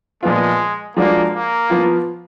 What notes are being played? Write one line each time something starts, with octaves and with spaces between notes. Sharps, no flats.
A#2 F3 G#3 B3 F4
F3 G#3 A#3 D4 F#4
A#3
F3 B3 F4